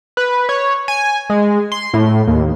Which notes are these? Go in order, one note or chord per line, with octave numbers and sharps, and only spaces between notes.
B4
C#5
G#5
G#3
C6
A2
D#2